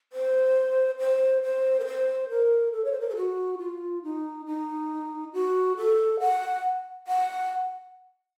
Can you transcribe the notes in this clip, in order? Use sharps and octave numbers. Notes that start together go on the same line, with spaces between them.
C5
C5
C5
A#4
C5
A#4
A4
C#5
C5
A#4
A4
F#4
F4
D#4
D#4
F#4
A4
F#5
F#5